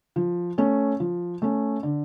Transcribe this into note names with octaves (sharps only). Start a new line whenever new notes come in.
F3
A3 C#4
F3
A3 C#4
D3